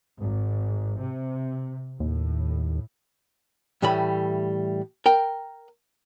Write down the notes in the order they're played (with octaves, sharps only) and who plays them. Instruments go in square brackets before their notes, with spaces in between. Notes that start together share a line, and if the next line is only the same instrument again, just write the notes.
[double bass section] G#1
C3
[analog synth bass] D#2 [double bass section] A2
[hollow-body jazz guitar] A2 E3 G3 A3 B5
A#4 G5